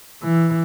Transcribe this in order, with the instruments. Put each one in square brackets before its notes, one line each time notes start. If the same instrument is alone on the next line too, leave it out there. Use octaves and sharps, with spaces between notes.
[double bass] E3